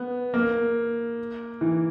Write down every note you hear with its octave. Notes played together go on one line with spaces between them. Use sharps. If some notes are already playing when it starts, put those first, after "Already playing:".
Already playing: B3
A#3
E3